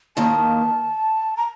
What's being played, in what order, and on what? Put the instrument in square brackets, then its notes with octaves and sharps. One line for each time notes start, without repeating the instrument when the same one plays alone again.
[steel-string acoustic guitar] D#2 D#3 A#3 [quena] A5
[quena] A#5